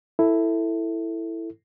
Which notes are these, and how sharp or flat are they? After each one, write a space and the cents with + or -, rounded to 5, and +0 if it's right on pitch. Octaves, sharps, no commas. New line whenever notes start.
E4 +0 A4 +15